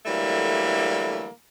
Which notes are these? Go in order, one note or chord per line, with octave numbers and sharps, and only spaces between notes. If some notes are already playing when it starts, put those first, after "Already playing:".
D3 E3 F#3 G3 A3 A#3